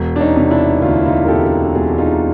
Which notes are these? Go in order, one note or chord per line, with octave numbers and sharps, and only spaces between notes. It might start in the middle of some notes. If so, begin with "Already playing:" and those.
Already playing: E1
D4
C#4 D#4
C3
D4 E4
D2 F4
E4
D#4 F4
A#4
E1 G4 A4
E1 F#4 G#4
D#4 F4